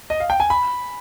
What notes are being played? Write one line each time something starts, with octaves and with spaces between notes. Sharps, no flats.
D#5
F5
G5
G#5
B5